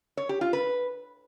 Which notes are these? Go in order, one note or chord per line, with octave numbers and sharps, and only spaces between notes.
C#5
G4
F4
B4